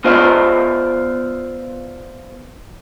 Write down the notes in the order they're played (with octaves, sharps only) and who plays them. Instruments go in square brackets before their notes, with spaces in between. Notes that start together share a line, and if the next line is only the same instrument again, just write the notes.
[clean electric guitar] B3 F4 C5 D5 E5